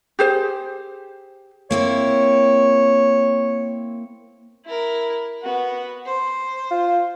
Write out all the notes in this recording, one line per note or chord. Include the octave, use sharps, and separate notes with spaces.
G4 G#4 C5
A#3 C4 E4 C#5
E4 A#4
B3 F#4
C5
F4